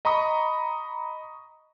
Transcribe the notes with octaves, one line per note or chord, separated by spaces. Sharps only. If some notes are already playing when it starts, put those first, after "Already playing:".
D#5 A#5 B5 C#6 D#6